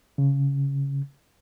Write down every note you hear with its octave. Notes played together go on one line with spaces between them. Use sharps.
C#3